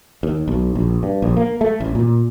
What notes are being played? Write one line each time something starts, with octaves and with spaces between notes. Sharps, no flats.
D#2
B1
A#1
G2
A#1
A#3
A3
A1
A#2